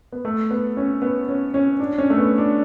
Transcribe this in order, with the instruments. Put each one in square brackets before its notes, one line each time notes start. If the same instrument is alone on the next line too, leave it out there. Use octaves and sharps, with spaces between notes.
[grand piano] B3
A3
B3
C#4
B3
C#4
C#4
D4
C#4
A3
B3
D4